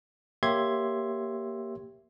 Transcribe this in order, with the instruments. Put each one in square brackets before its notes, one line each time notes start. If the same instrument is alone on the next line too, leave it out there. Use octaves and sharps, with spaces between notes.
[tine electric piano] A#3 G4 C#5 E5 C6 G#6